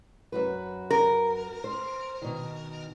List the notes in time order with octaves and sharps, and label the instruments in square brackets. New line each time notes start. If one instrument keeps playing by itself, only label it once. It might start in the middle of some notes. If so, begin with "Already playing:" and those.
[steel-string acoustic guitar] F#2 F#4 B4
[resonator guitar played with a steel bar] A#4
[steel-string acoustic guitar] C5
B2 D#3